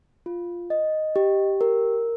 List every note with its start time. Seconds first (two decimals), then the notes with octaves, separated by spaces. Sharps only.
0.26 F4
0.70 D#5
1.16 G4
1.61 A#4